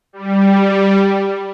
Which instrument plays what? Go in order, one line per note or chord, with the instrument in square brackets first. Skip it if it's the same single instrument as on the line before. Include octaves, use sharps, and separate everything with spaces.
[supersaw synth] G3